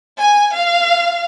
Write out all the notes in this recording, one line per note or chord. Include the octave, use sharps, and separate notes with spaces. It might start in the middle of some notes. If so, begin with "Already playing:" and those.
G#5
F5